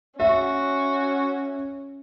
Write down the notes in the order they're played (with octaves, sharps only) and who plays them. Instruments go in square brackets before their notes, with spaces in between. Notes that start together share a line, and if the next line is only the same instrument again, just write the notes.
[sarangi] C#4 [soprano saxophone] F#4 [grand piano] E5